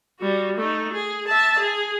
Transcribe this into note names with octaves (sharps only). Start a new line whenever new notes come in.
G3 F#4
A3 D#4
G#4
E5 A5
G#4